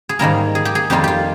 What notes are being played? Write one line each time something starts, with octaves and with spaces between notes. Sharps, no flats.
G#4
G#2 D#3 G3 A#3 A#4
G#4
G4
G#4
F2 D#3 G3 A#3 F4 G4
F4 G4